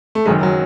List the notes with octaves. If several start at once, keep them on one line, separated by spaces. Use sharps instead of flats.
A3
F#1 F#2 D#3 G#3
F#3